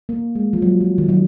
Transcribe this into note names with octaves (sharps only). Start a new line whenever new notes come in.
A#3
G#3
F3
F#3
F3
D#3
F#3